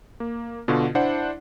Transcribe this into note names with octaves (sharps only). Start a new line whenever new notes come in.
A#3
B2 D3 F4 F#4
D4 E4 C5 F#5